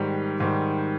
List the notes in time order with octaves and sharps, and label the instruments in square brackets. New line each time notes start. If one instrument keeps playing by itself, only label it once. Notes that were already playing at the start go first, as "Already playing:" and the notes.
Already playing: [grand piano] G#2 D#3 G3
G#2 D#3 G3